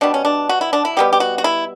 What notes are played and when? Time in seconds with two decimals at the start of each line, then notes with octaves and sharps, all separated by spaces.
0.01 B2 G3 B3 D4
0.14 C#4
0.25 D4
0.49 F#4
0.61 E4
0.73 D4
0.85 E4
0.97 B2 G3 B3 G4
1.13 G4
1.20 F#4
1.38 F#4
1.44 E4